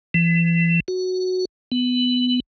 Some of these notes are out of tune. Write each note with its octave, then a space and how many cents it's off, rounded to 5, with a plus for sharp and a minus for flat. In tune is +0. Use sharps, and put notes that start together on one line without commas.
E3 +35
F#4 -5
B3 +15